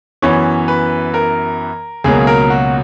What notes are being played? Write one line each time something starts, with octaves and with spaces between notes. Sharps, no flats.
F#2 E3 B3 C#5
B4
A#4
C#2 B2 F#3 A#3 G#4
A#4
F#4